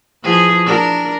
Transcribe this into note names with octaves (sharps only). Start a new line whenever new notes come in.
E3 F3 G#4
D4 A#4